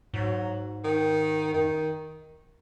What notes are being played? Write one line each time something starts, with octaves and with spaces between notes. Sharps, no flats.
G#2 F#3
D#3
F#2 D#3